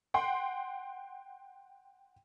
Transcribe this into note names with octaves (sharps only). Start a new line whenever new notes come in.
F#5 G5 C6